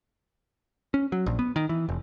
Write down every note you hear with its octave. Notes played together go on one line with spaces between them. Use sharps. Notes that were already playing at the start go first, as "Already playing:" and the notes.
C#4
F#3
A#1
B3
D#3
E3
F1